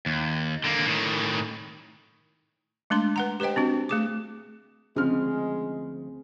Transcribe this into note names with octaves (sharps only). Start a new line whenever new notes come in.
D#2
D3 A#3
A2 D#3
G#3 A3 D4 C6
B4 F#5 A#5
G4 B4 C5 D#5 G5
C4 D4 F#4
A3 G#4 D6
D2 C#3 F3 G#3 C4 F6